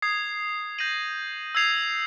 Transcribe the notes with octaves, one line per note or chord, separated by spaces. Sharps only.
D#6 G#6 C7
G6 A#6 D#7 F#7
E6 G#6 C7 F7